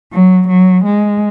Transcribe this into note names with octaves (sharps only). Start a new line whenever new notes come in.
F#3
F#3
G#3